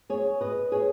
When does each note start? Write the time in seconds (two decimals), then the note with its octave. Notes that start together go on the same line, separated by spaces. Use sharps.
0.10 G#4 C#5
0.41 B4 D#5
0.72 G#4 C#5